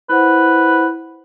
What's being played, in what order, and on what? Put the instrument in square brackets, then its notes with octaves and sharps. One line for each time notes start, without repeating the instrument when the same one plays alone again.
[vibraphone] E4 C5 F#5 [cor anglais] B4